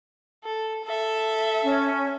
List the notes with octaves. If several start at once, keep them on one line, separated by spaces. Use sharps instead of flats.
A4
A4 E5
C#4